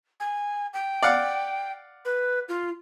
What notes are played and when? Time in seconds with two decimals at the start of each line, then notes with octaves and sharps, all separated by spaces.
0.20 G#5
0.73 G5
1.03 D5 F5 F#5
2.05 B4
2.49 F4